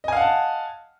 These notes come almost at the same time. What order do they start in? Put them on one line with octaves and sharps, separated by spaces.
D#5 G#5 F5 F#5 A5